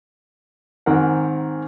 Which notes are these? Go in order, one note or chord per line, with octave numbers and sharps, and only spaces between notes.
G#2 D#3 C4 A#4 F#5